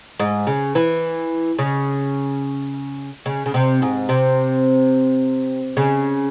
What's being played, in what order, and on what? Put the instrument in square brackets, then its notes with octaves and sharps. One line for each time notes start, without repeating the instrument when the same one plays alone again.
[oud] G#2
C#3
E3
C#3
C#3
C#3
C3
G#2
C3
C#3